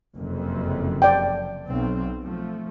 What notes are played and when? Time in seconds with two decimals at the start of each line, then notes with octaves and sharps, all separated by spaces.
0.15 F#1 F2 C3
1.02 D5 G5
1.67 B1 C4
2.23 F3 A3